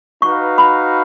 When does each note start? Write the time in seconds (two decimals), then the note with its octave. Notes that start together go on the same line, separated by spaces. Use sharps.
0.22 D#4 F#4 B4 F5 C#6
0.58 B5